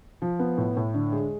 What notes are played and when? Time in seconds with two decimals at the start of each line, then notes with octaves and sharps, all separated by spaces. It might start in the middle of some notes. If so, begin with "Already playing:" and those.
0.22 F3
0.39 B3
0.58 A2
0.77 A2
0.94 D3
1.12 G#3